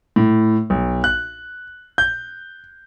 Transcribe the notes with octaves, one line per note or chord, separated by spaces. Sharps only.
A2
B1
F#6
G6